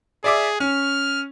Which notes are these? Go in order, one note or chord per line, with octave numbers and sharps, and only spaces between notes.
G#4 D5 E5 D6
C#4 F6